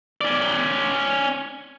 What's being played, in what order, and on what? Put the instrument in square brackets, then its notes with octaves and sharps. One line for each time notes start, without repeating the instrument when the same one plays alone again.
[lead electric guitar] C#4 D5